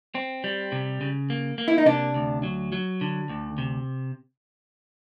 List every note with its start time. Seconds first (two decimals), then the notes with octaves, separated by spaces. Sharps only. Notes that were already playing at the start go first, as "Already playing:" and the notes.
0.15 C4
0.44 G3
0.72 C3
1.01 C#3
1.30 A#3
1.58 A#3
1.68 E4
1.78 D#4
1.86 C3 D4
2.15 D2
2.43 F#3
2.72 F#3
3.01 D3
3.29 D2
3.58 C3